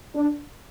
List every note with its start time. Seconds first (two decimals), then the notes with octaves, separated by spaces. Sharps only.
0.15 D4